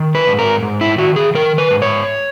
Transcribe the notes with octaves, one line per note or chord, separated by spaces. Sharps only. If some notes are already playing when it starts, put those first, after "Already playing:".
Already playing: D#3
B4
G#2
A#4
G#2
E4
D#3 F#4
G#4
D#3 A#4
B4
G#2
C#5